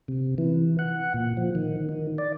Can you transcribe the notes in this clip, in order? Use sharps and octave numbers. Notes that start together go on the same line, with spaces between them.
C3
E3
F#5
A#2
F3
D#3
D#3
D5